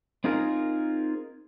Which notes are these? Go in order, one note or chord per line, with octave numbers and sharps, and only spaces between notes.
C4 D#4 F4 G#4 A#4